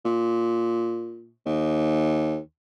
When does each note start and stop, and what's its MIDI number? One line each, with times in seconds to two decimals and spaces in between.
0.05 1.32 46
1.46 2.38 39